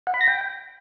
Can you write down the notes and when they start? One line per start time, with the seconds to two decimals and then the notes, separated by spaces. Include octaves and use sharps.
0.07 F#5
0.14 B5
0.21 A#6
0.28 G5